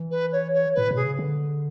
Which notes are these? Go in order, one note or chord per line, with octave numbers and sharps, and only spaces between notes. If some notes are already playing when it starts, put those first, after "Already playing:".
Already playing: E3
B4
C#5
C#5
A2 B4
B2
G#4
C#3
D3